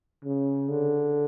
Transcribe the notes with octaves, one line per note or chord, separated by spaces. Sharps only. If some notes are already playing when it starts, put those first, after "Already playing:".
C#3
D3